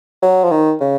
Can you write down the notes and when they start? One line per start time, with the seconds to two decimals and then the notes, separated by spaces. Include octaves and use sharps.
0.22 F#3
0.44 F3
0.51 D#3
0.80 C#3